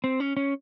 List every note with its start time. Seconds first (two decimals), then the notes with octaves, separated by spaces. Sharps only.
0.04 C4
0.20 C#4
0.37 C#4